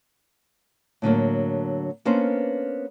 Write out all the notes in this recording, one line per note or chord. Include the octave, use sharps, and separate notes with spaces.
A2 D3 F#3 A#3
A#3 B3 C#4 D4 B4 C5